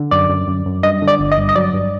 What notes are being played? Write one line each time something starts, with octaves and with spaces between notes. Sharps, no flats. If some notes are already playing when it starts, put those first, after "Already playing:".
Already playing: D3
F#2 D5
F#2
F#2
F#2
G2 D#5
D3
D5
G1
D#5
G2
D#5
F#3 D5
G2